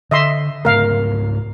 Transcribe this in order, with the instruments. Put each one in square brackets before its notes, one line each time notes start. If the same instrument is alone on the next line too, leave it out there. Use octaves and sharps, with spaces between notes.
[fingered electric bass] D3 [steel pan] D#5 E5 C6
[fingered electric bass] G#2 C#3 A3 [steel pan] A#4 F5